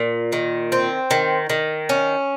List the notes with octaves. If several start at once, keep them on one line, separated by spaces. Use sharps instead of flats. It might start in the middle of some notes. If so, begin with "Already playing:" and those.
Already playing: A#2
D#3
C4
D#3
D#3
C#4